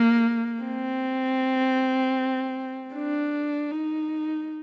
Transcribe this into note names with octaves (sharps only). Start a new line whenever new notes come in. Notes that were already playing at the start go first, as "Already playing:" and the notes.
Already playing: A#3
C4
D4
D#4